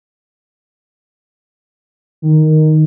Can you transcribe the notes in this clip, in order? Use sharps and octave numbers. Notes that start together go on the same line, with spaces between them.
D#3